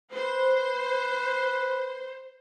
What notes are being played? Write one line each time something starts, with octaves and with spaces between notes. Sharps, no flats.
B4 C5